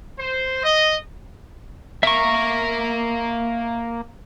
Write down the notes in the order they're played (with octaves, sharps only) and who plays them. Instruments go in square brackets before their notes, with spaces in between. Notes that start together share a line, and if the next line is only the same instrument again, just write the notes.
[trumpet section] C5
D#5
[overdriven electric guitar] A#3 A#4 [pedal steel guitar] E5 C#6